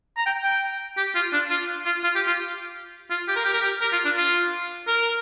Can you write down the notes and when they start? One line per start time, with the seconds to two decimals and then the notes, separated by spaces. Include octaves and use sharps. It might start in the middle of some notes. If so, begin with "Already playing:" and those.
0.17 A#5
0.26 G5
0.44 G5
0.97 G4
1.15 F4
1.33 D4
1.51 F4
1.86 F4
2.04 F4
2.15 G4
2.27 F4
3.11 F4
3.28 G4
3.36 A#4
3.45 G4
3.53 A#4
3.62 G4
3.82 A#4
3.93 F4
4.05 D4
4.17 F4
4.87 A#4